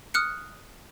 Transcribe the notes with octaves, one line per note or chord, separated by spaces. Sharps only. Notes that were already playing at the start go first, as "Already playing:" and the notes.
D#6 F6 F#6 C#7